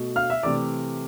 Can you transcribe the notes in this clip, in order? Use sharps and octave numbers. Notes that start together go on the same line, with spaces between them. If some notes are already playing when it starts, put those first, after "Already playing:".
Already playing: B2 A3
F5 F6
E5 E6
C3 E3 A3 D5 D6